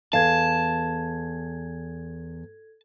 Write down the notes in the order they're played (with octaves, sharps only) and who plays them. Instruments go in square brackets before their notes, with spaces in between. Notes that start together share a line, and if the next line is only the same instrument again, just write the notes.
[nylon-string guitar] E2 F5 [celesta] A4 G#6 [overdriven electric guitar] A5